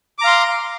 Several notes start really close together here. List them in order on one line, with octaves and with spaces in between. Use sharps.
D6 A#5 F5 C6